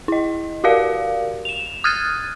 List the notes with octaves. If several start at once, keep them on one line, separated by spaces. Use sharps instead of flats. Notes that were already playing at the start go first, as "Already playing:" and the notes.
E4 D#5
F#4 G4 A#4 D5 F5
E7 F7
D#6 F6 F#6 G#6 A6 D#7